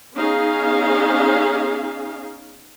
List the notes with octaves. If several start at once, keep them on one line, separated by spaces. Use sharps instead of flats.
B3 C#4 D#4 G#4 F5